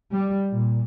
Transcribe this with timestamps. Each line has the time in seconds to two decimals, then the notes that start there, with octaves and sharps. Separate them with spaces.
0.13 G3
0.51 A#2